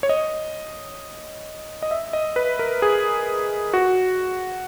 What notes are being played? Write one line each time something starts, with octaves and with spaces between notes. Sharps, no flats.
C#5
D#5
D#5
E5
D#5
B4
A#4
G#4
F#4